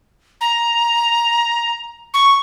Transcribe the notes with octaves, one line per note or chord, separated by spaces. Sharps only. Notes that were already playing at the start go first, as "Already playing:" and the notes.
A#5
C#6